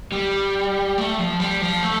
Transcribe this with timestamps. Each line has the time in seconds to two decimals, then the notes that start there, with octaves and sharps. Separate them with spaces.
0.12 G3
0.98 A3
1.19 F3
1.40 G3
1.61 F3
1.82 A3